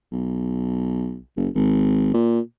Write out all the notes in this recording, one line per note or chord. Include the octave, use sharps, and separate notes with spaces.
B1
F#1
G#1
A#2